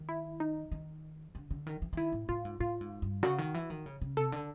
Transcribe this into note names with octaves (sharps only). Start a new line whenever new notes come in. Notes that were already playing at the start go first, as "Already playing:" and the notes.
Already playing: D#3
E4
D#4
D#3
D3
D3
D#3
E3
E3
D#3 E4
A2
A2 F4
G#2
A2 F4
G#2
G2
C#3 F#4
D#3
E3
D#3
C#3
C#3
C3 A4
D3